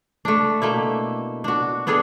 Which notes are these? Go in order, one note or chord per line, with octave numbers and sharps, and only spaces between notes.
A3 D4
B2 A3 A#3 E4
D4 F#4
B3 D4 G#4 A4